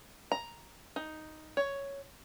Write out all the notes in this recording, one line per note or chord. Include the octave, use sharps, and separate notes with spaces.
A#5
D#4
C#5